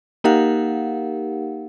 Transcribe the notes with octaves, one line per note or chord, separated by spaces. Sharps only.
A#3 D#4 G4 A#4 F5 F#5